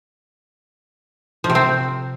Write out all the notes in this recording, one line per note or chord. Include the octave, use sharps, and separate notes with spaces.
F3
C3
C4